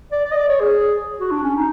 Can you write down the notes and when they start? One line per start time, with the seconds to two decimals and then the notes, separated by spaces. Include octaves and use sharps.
0.12 D5
0.25 D5
0.32 D#5
0.37 D5
0.49 C#5
0.60 G#4
1.20 F#4
1.31 D4
1.43 C#4
1.56 D#4